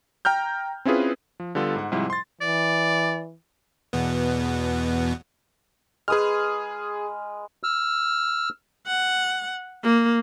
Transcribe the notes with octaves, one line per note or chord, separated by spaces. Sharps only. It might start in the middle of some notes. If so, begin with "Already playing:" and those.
G5 A#5 F6 G6
C4 C#4 E4 F4 G#4 B4
F3
D3 G3 B3 F4 A4
G#2 F#5
G#2 C3 F3 G3 E4
C6 A6
E3 D5
E2 B2 B3
G#3 G#4 B4 D#6 F6
E6 F6
F#5
A#3